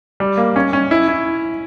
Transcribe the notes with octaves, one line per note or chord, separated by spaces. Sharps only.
G3
A#3
C#4
C#4
E4
E4